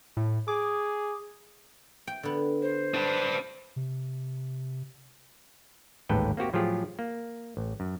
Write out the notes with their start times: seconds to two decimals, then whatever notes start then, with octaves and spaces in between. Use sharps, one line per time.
0.17 A2
0.48 G#4 D6
2.07 G5
2.23 D3 B3
2.62 C5
2.94 D4 B4
3.76 C3
6.09 A1 D#2 G#2 A4 B4 G5
6.37 A#3 C4 F#4 G4
6.53 A2 F3 F#3 F4 G4 G#4
6.99 A#3
7.57 A1
7.80 F#2